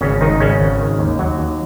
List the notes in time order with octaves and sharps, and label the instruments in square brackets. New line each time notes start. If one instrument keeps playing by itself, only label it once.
[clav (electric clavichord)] G#1 C#3 C#4
G#1 D#3 D#4
G#1 C#3 C#4
G#1
D#3
D#2
D#2 F#3 F#4
D#2